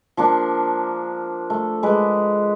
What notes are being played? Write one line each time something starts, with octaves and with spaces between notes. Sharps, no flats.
F3 A#3 D4
A3
G#3 B4 D6